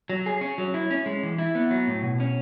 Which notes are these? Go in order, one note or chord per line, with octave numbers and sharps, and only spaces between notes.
F#3
G#4
C#4
F#3
E4
C#4
G#3
E3
E4
B3
F#3
A2
B2
C#4